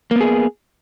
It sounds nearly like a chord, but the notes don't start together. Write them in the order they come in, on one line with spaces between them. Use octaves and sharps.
A#3 B3 G#4